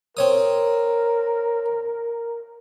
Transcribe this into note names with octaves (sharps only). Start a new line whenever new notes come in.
C4 A#4 C#5 D#6